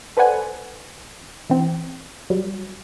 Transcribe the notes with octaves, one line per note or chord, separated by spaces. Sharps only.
A4 B4 C5 D5 F#5 G#5
E3 C4
F#3 G3